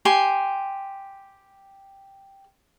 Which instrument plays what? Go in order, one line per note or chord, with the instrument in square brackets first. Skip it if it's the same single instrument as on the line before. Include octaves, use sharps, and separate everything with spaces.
[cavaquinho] G4 G#5 C6